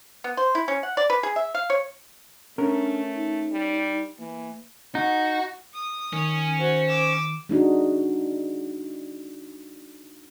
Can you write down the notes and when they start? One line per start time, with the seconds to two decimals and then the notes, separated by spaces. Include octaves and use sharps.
0.24 B3
0.37 C5
0.55 E4
0.68 C#4
0.83 F#5
0.97 D5
1.10 B4
1.23 G#4
1.36 E5
1.55 F5
1.70 C#5
2.58 A3 C#4 D4 A#4
3.15 D#4
3.52 G3
4.19 E3 A#3
4.95 D#4 F#4
5.74 D#6
6.13 D#3 C#4
6.59 F#4 C5
6.89 D6 E6
7.49 G#3 D4 D#4 F#4